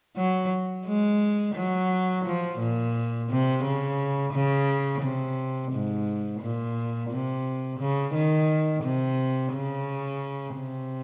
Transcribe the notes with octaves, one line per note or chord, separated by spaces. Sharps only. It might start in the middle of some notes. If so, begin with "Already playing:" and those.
F#3
G#3
F#3
F3
A#2
C3
C#3
C#3
C3
G#2
A#2
C3
C#3
D#3
C3
C#3
C3